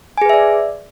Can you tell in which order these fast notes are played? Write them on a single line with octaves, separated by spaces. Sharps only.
G#5 G#4 B4 E5 D5